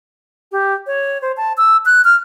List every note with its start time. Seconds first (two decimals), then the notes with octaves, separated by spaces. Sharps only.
0.52 G4
0.87 C#5
1.22 C5
1.37 A5
1.57 E6
1.86 F#6
2.05 F6